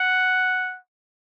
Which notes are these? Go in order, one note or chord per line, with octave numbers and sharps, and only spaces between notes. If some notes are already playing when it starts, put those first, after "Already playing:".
Already playing: F#5